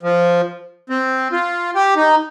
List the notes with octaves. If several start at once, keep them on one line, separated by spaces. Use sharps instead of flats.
F3
C4
F4
G4
D#4